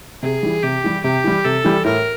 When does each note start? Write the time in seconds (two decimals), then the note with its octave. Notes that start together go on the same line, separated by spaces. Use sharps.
0.23 C3 G#4
0.43 E3 G3
0.63 C3 G4
0.84 E3 G3
1.04 C3 G4
1.24 E3 G3
1.44 C3 A4
1.64 E3 G3
1.84 A2 A#4